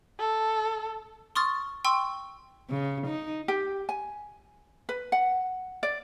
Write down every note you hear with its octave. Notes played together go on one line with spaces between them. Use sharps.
A4
C6 C#6 D#6 F6 A6
G5 C6 C#6 E6
C#3
D#4
G4
G#5
B4
F#5
D5